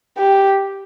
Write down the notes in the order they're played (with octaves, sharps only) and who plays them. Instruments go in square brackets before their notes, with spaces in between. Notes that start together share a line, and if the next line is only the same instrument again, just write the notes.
[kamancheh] G4